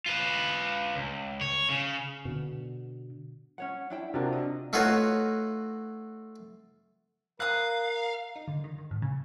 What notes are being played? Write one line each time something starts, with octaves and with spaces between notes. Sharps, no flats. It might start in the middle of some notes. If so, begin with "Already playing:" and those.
F4 B4
C#2
C#5
C#3
B2 D3
C#4 C#5 F#5
D4 E4 G5
C3 D4 F4 F#4 A#4
D#5
A3 D#4 F4 F#4 B4 C#5
A#4 F5 D#6 F#6
D#4
D3
D#3
D#3
A2
C#3